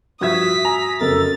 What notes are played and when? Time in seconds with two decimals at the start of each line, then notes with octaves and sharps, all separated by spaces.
0.21 G2 F3 F#4 E5 D#6 G#6 B6
0.65 G#5 A#5
1.01 F#1 F2 A4 A#4 A6